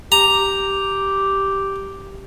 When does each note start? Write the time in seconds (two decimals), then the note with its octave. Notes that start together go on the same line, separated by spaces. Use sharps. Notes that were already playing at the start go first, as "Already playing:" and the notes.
0.12 G4 A#5